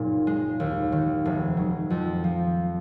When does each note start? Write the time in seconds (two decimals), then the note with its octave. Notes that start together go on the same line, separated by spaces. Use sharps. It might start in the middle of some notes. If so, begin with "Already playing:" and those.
Already playing: F#1 A#2 D#4
0.27 G#3
0.60 D#2
0.92 D#3
1.25 F1
1.57 F#3
1.90 F2
2.24 F3